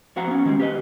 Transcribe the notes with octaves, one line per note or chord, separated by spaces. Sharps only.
F2 C4 F#4 F5 F#5 A#5
B3 C#4
D#3 G3 G#3 A#3 C4
G4 B4 D#5